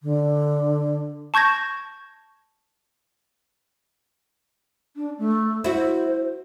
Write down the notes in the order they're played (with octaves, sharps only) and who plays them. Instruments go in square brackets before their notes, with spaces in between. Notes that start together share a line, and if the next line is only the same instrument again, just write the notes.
[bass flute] D3
[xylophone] A5 C#6 G6 G#6 A#6
[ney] D4
A3
[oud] E4 F#4 [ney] C5